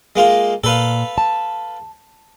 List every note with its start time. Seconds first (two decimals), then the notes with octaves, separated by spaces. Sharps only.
0.16 G#3 A#3 F4
0.64 A#2 A4 B4 F5
1.18 A5